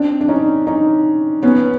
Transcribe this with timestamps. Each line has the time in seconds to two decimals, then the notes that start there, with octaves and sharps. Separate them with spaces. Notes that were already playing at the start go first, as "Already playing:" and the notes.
Already playing: C4 D4
0.21 D4
0.28 C#4 D#4
0.66 C#4 D#4
1.43 B3 C#4